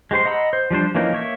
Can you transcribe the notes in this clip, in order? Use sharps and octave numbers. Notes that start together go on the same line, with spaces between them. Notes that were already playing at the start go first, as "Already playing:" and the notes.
G#3 G4 C5 C6
D#5 F#5 A#5 B5 E6
C5
F3 G3 D4 C5
E3 F3 A#3 C#4 D#4
A#3 C#5 E5